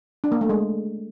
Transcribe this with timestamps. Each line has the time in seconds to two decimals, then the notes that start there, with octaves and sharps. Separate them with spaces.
0.24 D4
0.32 A#3
0.41 A3
0.49 G#3